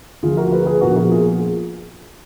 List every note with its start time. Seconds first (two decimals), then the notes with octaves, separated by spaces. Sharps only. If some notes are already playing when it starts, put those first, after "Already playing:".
0.22 D2 D3 F3 A#3 F4 G#4
0.37 F#4 A#4
0.52 G#4 B4
0.66 G#4 B4
0.81 A#1 A#2 F3 B3 F#4 A#4
0.96 F#4 A#4
1.11 F4 G#4